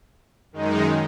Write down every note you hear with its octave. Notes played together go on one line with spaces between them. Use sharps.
F#2 D#3 G#3 D#4